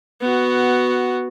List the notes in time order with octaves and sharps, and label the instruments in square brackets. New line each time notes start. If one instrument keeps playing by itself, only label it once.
[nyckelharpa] B3 F#4